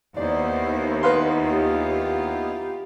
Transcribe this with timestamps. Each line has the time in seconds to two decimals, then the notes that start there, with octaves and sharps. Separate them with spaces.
0.17 D#2 B3 D#4 E4 C5 D5
1.03 B4 F5 C6
1.44 F4 G4